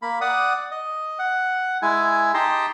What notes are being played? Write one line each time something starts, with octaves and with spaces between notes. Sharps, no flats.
A#3 B5
D5 F#5 D#6
D#5
F#5
G#3 E4 G#5
D#4 G4 G5 A5 A#5 C6